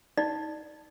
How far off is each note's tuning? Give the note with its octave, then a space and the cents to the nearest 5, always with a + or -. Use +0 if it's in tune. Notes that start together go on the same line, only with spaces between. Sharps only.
D#4 +25 D5 +15